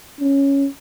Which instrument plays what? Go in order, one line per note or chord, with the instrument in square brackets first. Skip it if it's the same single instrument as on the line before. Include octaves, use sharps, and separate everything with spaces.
[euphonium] C#4